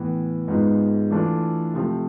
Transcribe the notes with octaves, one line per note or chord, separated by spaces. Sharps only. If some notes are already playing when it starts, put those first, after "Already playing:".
Already playing: A2 E3 B3
G#2 G#3 B3 F4
E3 A3 D4 F4 A4
C3 F3 A3